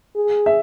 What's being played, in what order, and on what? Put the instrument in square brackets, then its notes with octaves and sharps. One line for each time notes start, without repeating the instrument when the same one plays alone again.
[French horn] G#4
[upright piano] E5